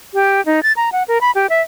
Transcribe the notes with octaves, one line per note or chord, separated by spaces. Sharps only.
G4
D#4
A6
A#5
F#5
A#4
B5
G4
E5